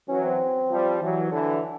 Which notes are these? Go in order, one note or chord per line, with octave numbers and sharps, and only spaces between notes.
E3 F#3 C#4
C4
F3 G3
E3 F#3
D3 E3